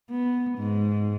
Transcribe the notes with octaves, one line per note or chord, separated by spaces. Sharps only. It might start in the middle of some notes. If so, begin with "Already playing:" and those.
B3
G#2